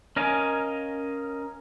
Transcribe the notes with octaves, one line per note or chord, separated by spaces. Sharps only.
C#4 A#4 D#5 F5 G#5